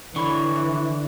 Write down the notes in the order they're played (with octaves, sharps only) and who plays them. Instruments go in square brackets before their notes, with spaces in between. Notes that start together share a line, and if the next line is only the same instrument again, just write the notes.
[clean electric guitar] D3 [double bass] E3 [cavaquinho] C#5 B5 C#6